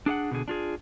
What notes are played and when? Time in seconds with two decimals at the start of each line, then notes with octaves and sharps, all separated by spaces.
0.06 D4 G#4 F5 F#5
0.31 B2 D3 G#4
0.48 D4 F4 G#4